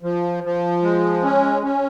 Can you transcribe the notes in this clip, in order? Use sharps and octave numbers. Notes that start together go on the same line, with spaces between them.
F3
F3
G#3
C#4
C#4